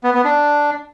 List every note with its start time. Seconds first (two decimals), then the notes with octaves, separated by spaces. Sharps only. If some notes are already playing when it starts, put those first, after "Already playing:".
0.04 B3
0.14 B3
0.24 D4